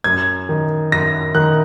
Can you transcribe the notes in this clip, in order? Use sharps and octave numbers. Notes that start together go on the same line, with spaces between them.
F#2 G#6
D#3
F#2 A#6
D#3 F#6